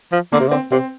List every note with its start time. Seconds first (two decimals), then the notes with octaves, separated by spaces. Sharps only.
0.12 F3
0.33 D3 A#3
0.40 C3
0.49 D3
0.51 C4
0.71 C3 C4